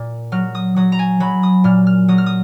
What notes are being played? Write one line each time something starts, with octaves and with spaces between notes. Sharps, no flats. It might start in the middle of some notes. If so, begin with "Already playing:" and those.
Already playing: A#2
F#3 F6
D#6
F#3 D#6
A#5
G#5
F#3 B5
D#6
A#2 F6
F6
F#3 D#6
F6
D#6